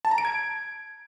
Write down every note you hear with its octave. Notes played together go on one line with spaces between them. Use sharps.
A5
A#5
D7
G#6